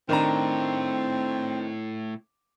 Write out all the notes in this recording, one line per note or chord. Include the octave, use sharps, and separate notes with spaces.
A2 D#3 C4 D4 A#5